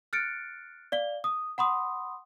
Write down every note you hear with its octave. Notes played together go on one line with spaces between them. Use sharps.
F6 F#6 A6 C#7 D7
D5 F5 G7
D#6
F#5 B5 C6 D#6